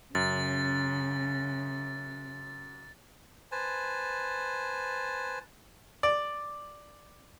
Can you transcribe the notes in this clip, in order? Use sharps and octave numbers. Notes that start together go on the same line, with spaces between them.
F#2 C#3 A6
B4 C5 G#5 A5
D5